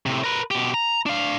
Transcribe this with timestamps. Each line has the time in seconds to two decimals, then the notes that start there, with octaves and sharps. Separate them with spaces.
0.06 A2 C3
0.24 A#4 B4
0.51 B2 G4
0.74 A#5
1.06 D4 F5